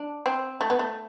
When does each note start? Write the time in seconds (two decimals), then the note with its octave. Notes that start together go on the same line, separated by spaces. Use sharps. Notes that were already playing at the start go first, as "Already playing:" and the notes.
Already playing: D4
0.26 C4
0.61 A3
0.70 B3
0.79 A3